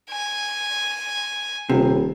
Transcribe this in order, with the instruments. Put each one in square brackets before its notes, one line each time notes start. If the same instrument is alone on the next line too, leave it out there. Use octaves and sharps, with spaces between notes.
[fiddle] G#5
[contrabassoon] D#1 [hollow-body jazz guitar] C3